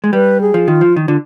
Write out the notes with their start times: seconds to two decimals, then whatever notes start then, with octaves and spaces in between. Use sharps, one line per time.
0.04 G#3
0.13 G3 B4
0.41 G#4
0.54 F3
0.68 D#3 F4
0.81 F3
0.96 D#3
1.07 D3 F4